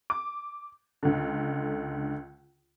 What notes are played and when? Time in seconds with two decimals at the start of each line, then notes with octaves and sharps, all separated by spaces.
0.10 D6
1.03 C#2 D3